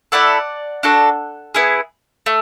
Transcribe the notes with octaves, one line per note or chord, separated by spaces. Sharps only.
A3 E4 A4 D5 F#5
D4 F#4 A4
B3 E4 G#4
A3